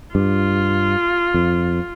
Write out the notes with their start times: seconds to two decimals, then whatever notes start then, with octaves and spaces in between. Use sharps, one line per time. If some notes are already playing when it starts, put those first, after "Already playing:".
0.15 G2 F4
1.34 F2